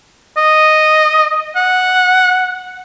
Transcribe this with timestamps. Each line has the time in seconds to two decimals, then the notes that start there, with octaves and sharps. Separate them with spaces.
0.37 D#5
1.56 F#5